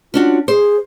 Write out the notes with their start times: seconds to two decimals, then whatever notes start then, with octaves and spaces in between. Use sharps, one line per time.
0.14 C#4 D4 F4 F#4
0.48 G#4 C5